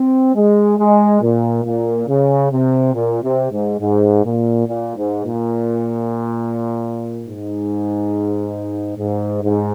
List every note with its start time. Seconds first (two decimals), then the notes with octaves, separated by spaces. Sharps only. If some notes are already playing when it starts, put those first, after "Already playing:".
Already playing: C4
0.35 G#3
0.79 G#3
1.21 A#2
1.64 A#2
2.08 C#3
2.51 C3
2.94 A#2
3.23 C3
3.52 G#2
3.80 G#2
4.24 A#2
4.67 A#2
4.96 G#2
5.24 A#2
7.25 G#2
8.98 G#2
9.42 G#2